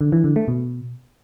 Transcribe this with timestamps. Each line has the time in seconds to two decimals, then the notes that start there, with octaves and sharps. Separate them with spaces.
0.01 D3
0.12 E3
0.24 D3
0.36 A3
0.48 B2